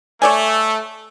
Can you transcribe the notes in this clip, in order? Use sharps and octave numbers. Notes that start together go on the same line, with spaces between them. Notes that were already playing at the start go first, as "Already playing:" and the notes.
A3 C#5 D5 G#5